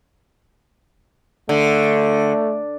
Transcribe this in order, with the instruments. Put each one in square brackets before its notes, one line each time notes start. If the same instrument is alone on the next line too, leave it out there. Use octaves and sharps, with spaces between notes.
[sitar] D3 [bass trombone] A3